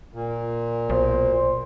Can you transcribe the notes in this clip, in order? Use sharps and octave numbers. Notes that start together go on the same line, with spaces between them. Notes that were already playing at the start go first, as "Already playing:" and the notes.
A#2
B1 C5